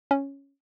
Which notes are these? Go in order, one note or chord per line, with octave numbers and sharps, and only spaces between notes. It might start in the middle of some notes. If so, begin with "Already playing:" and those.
C#4